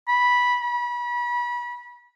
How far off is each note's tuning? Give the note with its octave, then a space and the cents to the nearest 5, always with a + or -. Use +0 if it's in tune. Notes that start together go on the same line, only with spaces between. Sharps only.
B5 -10
B5 -30